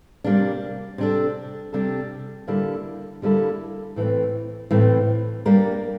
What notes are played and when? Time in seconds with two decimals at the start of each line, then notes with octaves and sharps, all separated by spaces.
0.24 C3 G3 A#3 D4
0.98 C3 G3 D4 A4
1.73 C3 G3 D4 A4
2.48 D3 G3 A#3 E4 A4
3.22 D3 G3 A#3 E4 A4
3.96 A2 E3 A3 C4
4.71 A2 E3 A3 C4
5.46 G3 A#3 D4 G4 A#4